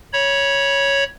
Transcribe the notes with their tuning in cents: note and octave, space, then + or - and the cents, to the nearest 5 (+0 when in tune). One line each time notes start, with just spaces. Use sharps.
C#5 +0 B5 -30